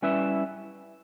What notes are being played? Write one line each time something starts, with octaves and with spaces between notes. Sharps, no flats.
G3 C#4 E4 B4 E5